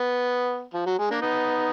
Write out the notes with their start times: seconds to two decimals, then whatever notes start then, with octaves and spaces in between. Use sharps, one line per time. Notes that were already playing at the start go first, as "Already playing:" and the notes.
Already playing: B3
0.74 F3
0.86 F#3
0.98 G#3
1.10 A#3 D4
1.22 B3 D#4